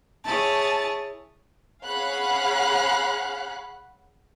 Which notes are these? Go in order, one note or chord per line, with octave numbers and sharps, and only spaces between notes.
E4 G#4 C#5 A5
G#4 C#5 F5 F#5 B5 F#6